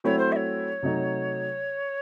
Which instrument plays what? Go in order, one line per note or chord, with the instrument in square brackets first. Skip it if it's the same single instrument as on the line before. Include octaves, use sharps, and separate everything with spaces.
[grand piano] F#3 A3 C4 E4 [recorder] C#5
[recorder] C5
E5
C#5
[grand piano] C3 F#3 A3 D#4